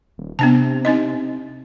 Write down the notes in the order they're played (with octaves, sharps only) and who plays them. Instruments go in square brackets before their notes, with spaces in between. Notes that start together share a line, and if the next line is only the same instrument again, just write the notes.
[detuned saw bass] D#1
[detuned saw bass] C3 [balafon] B3 D4 A5
[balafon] C4 D#4 D#5